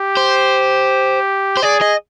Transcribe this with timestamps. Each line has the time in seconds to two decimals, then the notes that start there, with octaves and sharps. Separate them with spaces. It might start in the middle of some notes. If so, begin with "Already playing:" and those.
Already playing: G4
0.17 C5
1.57 C5
1.63 G#4 D5
1.81 D#5